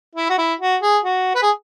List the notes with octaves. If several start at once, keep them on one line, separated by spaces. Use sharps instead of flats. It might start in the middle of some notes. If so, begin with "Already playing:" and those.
E4
F#4
E4
F#4
G#4
F#4
B4
G#4